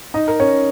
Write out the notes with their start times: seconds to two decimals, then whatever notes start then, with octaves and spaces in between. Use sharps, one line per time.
0.14 D#4 D#5
0.28 A#4
0.40 C#4 C#5